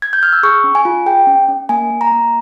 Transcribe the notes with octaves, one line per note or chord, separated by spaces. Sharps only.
G#6
G6
F6
E6
G#4 C#6
C#4
G#5
F4
G#4 G5
C#4
C#4
A#3 G#5
A#3
A#5
A#3